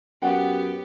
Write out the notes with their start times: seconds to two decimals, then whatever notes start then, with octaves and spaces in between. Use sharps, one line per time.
0.22 F#2 B3 G4 F#5 G5